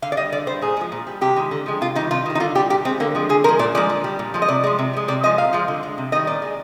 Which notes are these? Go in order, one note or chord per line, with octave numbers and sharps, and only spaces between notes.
D3 F5
D5
G3 D#5
D3 D5
G3 C5
A#2 G#4
F3 G#3
A#2
G3
C3 G4
D#3 G#3
D3
F3 G#3
C3 F4
D#3 G3 D#4
C3 F4
D#3 G3
D#4
D3 F4
G3 G4
A#2 G4
G#3 C4
D3 A#3
F3 G#3
D3 G#4
F3 G#3 A#4
A#2 D5
F3 G#3 D5
D3
G3
A#2
F3 G#3
D#5
C3 D5
F3 G#3
C3
F3 G#3
C3 D5
F3 G#3 D#5
A#2 F5
F3 G#3
D3
G#3
C3
D#3 G3 D#5
A#2 D5
G#3